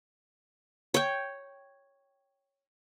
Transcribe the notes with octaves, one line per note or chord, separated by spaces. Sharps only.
C#5 G5